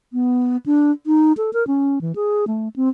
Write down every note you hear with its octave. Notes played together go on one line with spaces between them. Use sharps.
B3
D4
D#4
A4
A#4
C#4
E3
G#4
A3
C4